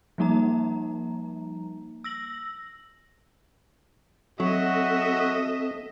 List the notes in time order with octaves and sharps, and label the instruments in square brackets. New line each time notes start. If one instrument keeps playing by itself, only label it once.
[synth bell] F3 G3 A#3 D#4 A#5
E6 A#6 F#7
[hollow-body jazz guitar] F#3 [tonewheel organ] C4 A4 [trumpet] F#4 [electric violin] D#5 E5